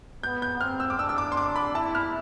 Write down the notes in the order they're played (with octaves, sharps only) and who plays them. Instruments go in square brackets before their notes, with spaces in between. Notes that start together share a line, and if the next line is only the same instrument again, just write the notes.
[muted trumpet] B3 [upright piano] G6
[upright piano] G6
[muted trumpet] C4 [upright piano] F6
[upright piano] E6
D6
[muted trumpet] D4 [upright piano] E6
[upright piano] E6
D6
C6
D6
B5
[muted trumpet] E4 [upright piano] A5
[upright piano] F6